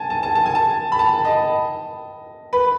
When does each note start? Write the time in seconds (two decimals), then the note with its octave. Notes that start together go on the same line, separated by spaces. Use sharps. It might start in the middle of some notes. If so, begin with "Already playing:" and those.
Already playing: G#5 A5
0.10 A5
0.23 A5
0.35 A5
0.46 G#5
0.55 A5
0.92 B5
0.99 A5
1.25 D#5
2.53 B4